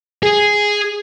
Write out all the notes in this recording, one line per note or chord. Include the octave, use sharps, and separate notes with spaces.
G#4